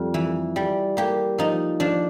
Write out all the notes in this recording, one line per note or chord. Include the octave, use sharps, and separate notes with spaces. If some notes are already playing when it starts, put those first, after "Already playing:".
Already playing: F2 G3
E3
G3
A#3 G4
F3 D#4
F3 D4